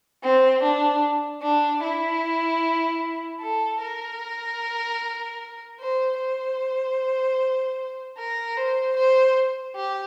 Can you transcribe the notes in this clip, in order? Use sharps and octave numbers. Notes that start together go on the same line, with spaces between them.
C4
D4
D4
E4
A4
A#4
C5
C5
A#4
C5
C5
G4